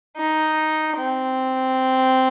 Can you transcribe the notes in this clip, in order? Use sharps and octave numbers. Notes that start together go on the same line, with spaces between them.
D#4
C4